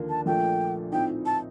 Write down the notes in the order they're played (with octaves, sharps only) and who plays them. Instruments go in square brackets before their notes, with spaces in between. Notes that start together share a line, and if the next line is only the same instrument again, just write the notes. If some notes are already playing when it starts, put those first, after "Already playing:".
Already playing: [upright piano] D#2 D3 F3 A#3 D4
[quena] A5
[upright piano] A#1 A#2 F3 A3 [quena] G5
[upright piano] A2 F3 C4 D#4 [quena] G5
[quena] A5